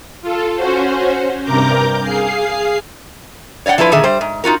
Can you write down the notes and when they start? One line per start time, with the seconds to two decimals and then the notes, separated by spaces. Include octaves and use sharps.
0.22 F4 A4
0.56 C#4 F#4 C5
1.43 G2 C3 A#4 A#5 D6 G6
2.02 G#4 F5 C7
3.66 C#5 D5 E5 F#5 G5
3.78 F3 E4 F4 A#4 B4
3.92 A#2 D3 D#3 G#4 E5
4.04 G3 C5
4.21 G#2
4.44 D#4 F4 F#4 A#4